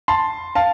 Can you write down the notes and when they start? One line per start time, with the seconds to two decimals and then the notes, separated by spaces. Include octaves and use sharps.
0.08 A5 C6
0.55 F5 A5